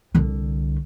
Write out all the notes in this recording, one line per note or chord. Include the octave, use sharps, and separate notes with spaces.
C2 D3